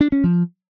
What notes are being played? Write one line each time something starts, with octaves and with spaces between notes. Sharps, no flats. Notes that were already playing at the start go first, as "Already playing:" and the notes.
D4
C#4
F3